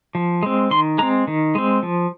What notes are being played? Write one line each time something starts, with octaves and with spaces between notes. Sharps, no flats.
F3
G#3 C4
D#3 C6
G#3 C4 A#5
D#3
G#3 C4
F3